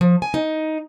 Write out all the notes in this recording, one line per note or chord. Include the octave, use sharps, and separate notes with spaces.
F3
G#5
D#4